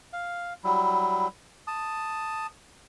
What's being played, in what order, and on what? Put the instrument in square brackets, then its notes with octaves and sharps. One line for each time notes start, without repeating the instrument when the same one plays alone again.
[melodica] F5
F#3 G3 E4
A5 D#6